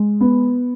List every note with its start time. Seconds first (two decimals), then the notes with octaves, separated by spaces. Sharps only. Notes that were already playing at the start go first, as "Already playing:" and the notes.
Already playing: G#3
0.21 B3